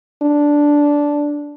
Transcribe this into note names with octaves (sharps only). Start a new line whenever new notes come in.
D4